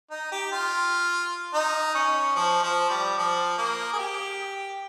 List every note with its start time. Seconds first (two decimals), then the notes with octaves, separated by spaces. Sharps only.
0.11 D#4
0.31 G4
0.52 F4
1.53 D#4
1.94 C#4
2.35 F3
2.62 F3
2.89 G3
3.17 F3
3.58 A#3
3.92 G#4
3.98 G4